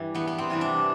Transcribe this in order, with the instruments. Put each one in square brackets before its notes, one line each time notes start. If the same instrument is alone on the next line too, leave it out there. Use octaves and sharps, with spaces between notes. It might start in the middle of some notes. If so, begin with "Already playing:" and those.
Already playing: [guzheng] G2 E3 G3
E2 B3
B3
C4
C3 E3 G3
D4